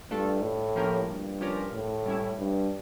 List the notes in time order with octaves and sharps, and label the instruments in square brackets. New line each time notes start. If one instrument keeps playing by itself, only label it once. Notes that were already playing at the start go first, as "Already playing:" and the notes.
[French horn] G2 [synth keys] A3 D4 F4 A4
[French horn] A2
[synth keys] F3 A#3 C#4 G4 A#4
[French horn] G2
[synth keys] F3 C#4 G4 A#4
[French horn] A2
[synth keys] G3 C#4 E4
[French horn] G2